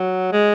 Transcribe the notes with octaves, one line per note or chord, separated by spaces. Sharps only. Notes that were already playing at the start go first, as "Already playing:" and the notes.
Already playing: F#3
G#3